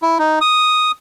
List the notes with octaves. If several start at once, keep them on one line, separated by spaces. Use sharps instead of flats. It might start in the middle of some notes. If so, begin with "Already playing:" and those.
E4
D#4
D#6